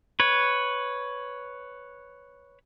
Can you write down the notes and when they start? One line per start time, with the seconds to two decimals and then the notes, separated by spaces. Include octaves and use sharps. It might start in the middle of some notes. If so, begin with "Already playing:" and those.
0.20 B4 C#5